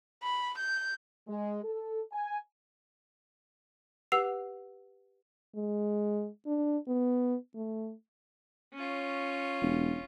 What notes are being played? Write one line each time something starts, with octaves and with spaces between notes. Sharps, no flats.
B5
G6
G#3
A4
G#5
G4 B4 F#5 E6 C7 F7
G#3
D4
B3
A3
C#4 F4 C#5
E1